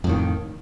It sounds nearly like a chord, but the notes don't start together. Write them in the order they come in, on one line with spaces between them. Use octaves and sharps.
F2 A2 D#3